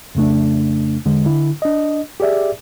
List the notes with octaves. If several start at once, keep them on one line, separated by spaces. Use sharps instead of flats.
F2 C#3 A3 D4
E2 D3 G#3
D3 E4
D4 D#5
G4 G#4 D5 E5